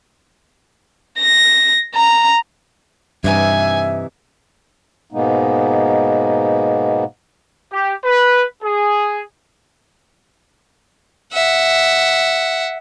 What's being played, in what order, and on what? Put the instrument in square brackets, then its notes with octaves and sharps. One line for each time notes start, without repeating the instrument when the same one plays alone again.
[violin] A#6
A#5
[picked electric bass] G2 [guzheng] C3 E3 D#4 [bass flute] E5 [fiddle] G#5
[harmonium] G#2 B2 G#3 A#3 B3 D#4
[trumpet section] G4
B4
G#4
[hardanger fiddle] E5 F#5